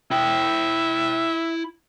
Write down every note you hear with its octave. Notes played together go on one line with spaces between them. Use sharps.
E4 E5 G5